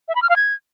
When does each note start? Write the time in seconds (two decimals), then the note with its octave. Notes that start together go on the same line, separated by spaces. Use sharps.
0.08 E5
0.15 B5
0.22 F6
0.29 F5
0.36 G#6